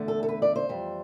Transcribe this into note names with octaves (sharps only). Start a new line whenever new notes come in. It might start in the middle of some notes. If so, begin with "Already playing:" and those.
Already playing: E2 D3 A3
A4
A4
B4
D5
C5
F2 E3 G3